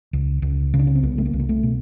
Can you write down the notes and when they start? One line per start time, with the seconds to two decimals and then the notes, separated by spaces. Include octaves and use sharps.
0.13 C#2
0.42 C#2
0.74 C#3
0.79 D4
0.87 C#4
0.95 C4
1.03 C2 B3
1.18 A3
1.25 A#3
1.33 C2
1.39 A#3
1.49 A3
1.63 B2